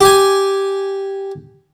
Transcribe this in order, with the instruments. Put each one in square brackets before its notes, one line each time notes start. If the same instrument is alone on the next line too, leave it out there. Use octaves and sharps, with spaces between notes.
[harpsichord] G4 G#5